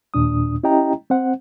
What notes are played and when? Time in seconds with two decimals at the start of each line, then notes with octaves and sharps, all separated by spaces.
0.14 D#2 A#2 D4 D#6
0.63 C#4 E4 G4 D#5 G5 A#5
1.10 C4 C5 F#5